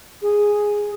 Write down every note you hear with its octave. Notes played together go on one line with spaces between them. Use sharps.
G#4